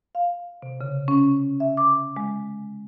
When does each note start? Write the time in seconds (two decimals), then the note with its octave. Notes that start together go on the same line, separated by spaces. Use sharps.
0.15 F5
0.62 C3
0.81 C#3
1.08 C#4
1.60 E5
1.77 D6
2.17 G#3